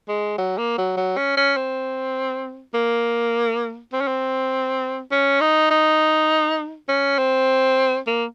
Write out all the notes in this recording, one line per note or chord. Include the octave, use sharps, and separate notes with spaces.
G#3
F#3
A#3
F#3
F#3
C#4
C#4
C4
A#3
C4
C#4
C4
C#4
D#4
D#4
C#4
C4
A#3